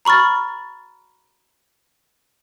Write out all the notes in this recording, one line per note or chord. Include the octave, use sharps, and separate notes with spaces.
A#5 B5 C#6 F6 A6